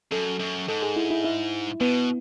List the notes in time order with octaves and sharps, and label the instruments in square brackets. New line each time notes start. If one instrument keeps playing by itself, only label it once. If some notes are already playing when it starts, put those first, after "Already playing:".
[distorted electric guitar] F#2 [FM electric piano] A4
[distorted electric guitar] F#2
[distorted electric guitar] G#2 [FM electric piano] A4
[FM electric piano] G#4
E4
E4
E4
[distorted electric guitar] B2 [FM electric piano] B3